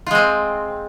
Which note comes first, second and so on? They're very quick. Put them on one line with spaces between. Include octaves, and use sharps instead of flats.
F4 G#3 C4